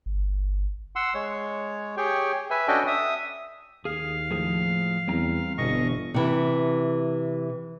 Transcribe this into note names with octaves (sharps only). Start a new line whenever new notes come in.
G1
F#5 C6 E6
G#3 C#5
G4 G#4 C#5 G5
B4 E5 G#5
C#4 D4 F#4 A4 D#5 G5
E5 D#6
D#2 G#4 F5
A2 F3 G#4
E2 G3 C4 A#5
G1 B2 E3 D#5 C#6
C3 E3